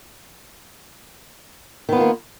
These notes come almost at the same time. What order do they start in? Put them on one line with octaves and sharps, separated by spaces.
D#3 B3 F4 A#3